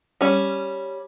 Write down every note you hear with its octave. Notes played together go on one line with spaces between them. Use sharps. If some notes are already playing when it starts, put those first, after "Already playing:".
G3 C#4